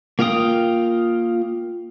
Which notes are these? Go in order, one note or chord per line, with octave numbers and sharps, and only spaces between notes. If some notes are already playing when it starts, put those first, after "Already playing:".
A#3 F4 F5 G5 D#6